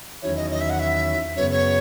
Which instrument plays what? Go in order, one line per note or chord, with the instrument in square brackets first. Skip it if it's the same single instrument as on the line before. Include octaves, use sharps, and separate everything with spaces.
[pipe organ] E2 D#3 F#3 C#4 E4 [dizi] C#5
[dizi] D#5
D#5
E5
F#5
E5
[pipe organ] F#2 C#3 F#3 B3 [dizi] C#5
[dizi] C#5